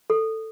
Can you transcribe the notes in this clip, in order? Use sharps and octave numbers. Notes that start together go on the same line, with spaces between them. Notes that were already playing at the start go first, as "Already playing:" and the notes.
A4